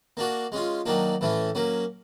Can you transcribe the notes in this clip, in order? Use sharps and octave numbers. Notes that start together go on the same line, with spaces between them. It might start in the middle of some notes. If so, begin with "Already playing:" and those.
A#3 D4 F#4 A#4
G#3 C#4 F4
D#3 F#3 A#3 D4
A2 E3 A3 C#4
F#3 A#3 C#4